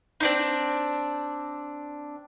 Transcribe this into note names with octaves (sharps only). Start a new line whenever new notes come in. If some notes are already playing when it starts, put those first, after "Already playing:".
C4 D4 D#4